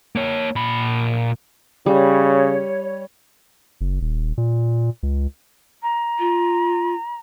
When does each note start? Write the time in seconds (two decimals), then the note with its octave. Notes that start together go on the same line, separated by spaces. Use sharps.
0.16 A#3 C#5
0.56 A#2 B5
1.86 C#3 G3 C#5
3.81 F#1
4.01 D#1
4.38 A#2
5.03 C#2
5.82 A#5
6.19 F4